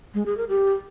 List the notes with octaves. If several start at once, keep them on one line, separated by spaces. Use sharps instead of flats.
G#3
G#4
A#4
G4